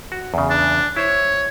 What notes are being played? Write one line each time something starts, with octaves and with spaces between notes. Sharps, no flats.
F#4
E2 C#3
D4
E4 C5 C#5